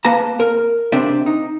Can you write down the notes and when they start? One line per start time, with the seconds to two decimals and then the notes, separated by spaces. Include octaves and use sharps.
0.05 A#3 B4 A5 A#5
0.40 A#4
0.92 C3 C4 D4 D5 E5
1.26 D#4